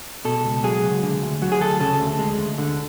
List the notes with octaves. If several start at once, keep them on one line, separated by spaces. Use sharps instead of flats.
B2 A4
C#2
F#3 G#4
C#2
D3
D2
F#3
G#4
D2 A4
C#3 A4
D2
G#3
D2
D3